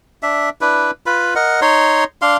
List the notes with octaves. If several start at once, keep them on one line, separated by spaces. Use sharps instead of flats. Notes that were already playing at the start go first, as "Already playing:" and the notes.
D4 E5
D4 E4 B4
F4 B4 B5
A#4 D#5 F#5
D#4 C#5 C6
D4 F5 C6